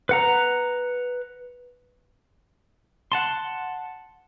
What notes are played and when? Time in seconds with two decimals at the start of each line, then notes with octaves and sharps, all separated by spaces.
0.09 B4 F#5 A#5
3.12 F#5 A5 C6